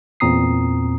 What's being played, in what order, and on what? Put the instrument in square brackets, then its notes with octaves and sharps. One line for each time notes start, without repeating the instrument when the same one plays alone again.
[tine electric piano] E2 A#2 C4 A#5 D#6 C7